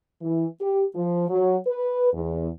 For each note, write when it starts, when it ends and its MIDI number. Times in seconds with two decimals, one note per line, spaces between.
0.22 0.45 52
0.60 0.84 67
0.94 1.26 53
1.29 1.56 54
1.67 2.11 71
2.13 2.49 40